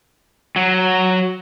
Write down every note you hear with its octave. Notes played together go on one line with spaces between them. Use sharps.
F#3